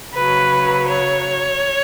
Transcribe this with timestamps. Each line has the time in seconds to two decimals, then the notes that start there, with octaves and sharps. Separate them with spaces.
0.13 C#3 F#3 B4
0.88 C#5